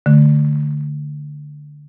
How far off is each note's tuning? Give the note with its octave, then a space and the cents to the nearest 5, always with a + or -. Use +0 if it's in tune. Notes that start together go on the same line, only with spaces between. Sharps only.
D3 +0 A3 +0